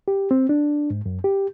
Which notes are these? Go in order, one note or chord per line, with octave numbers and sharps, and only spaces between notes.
G4
C4
D4
G#2
F#2
G4